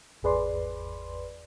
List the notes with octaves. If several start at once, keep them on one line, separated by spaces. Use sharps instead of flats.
G#1 E2 G#4 B4 D5 C6